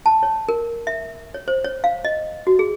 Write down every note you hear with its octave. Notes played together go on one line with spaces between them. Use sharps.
A5
C#5
A#4
E5
C#5
C5
C#5
F5
D#5
F#4
G#4